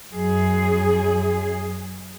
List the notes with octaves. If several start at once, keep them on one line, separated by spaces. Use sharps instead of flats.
F#2 G#4